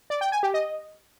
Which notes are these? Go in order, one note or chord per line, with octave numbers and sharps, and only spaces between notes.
D5
G5
G#5
G4
D#5